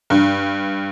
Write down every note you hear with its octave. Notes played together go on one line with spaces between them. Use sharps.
G2